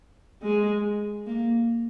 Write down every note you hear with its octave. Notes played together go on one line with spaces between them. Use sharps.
G#3
A#3